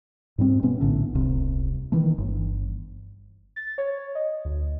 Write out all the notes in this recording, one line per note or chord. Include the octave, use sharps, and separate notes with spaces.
G#2 G3 C4
B2 B3 C#4
A#1 A2 D3
D#1 C2 C3
D#3 E3 A3
G1
A6
C#5
D#5
D2